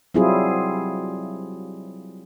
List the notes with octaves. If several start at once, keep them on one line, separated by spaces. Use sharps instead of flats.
F#3 G3 C4 E4 F4 G#4